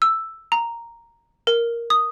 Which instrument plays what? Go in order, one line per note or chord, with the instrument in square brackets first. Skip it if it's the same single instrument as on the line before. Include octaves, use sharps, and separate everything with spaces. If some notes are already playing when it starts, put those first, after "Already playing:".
[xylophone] E6
A#5
A#4
D#6